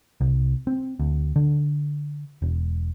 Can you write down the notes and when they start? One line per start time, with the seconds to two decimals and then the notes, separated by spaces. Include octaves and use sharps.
0.21 C2
0.67 C4
0.99 D2
1.36 D3
2.42 E1